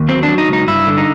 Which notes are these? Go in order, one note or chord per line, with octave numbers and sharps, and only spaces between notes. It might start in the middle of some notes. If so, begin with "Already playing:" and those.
Already playing: D#2
F#3 C4
D4
F#3
D#4
C#2
D#4
G2 E4
D3
D#4